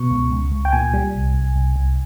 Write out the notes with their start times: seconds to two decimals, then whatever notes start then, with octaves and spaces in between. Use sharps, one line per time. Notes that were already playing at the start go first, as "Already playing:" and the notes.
Already playing: B2 C#6
0.11 C#2
0.31 C#2
0.52 C#2
0.65 G5
0.73 A#2 G#5
0.93 G3
1.14 C2
1.34 C2
1.55 C2
1.76 C2